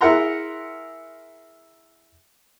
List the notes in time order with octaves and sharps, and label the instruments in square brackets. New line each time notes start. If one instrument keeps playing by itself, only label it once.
[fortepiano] E4 G#4 A#4 F#5 A#5 C6